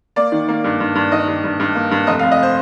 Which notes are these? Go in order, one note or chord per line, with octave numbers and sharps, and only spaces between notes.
A#3 D5
D#3
A#3
G2
G2
G2
D#3 D#5
G2
G2
G2
A#3
G2
F1 D#5
F5
F1
D#5
C5